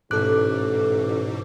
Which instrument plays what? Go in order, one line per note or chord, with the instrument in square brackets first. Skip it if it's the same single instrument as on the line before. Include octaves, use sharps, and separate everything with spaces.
[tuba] A1 [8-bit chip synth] G#2 B2 [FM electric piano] A4 D6 [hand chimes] F#6